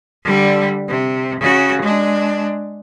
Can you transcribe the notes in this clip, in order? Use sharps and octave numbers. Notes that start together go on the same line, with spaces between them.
D3 G3
C3
C#3 F#4
G#3 D4